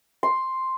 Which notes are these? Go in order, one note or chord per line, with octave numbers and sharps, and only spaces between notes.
C6